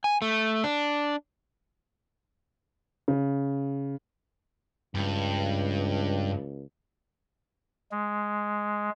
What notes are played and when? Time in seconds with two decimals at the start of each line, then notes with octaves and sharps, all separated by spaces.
0.04 G#5
0.22 A3
0.64 D4
3.08 C#3
4.95 C#2 G2
7.92 G#3